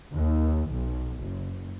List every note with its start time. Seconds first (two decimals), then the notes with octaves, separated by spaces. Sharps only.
0.13 D#2
0.70 B1
1.20 F#1